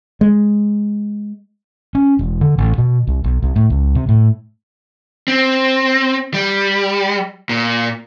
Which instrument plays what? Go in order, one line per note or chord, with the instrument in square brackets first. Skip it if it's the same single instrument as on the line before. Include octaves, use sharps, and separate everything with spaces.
[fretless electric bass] G#3
[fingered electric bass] C#4
E1
D3
A1
B2
C2
B1
C2
A2
C#2
C3
A2
[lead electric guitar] C4
G3
A#2